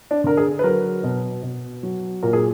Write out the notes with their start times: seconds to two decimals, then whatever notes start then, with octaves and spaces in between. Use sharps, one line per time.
0.11 D4
0.24 D3 A#4
0.37 G#4
0.59 B4
0.64 F#3 A#4
1.03 B2
1.43 B2
1.83 F#3
2.23 A#2 A#4
2.33 G#4